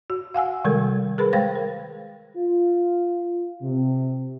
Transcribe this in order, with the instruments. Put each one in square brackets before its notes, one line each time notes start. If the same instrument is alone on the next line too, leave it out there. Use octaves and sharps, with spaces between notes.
[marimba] F#4
F5 F#5 G#5 E6
C3 D#3 G3 G#3 A4 A#4
G#4 A#4 B4 B5
G#3 C5 F5 G5 A6 A#6
A#4
[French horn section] F4
C3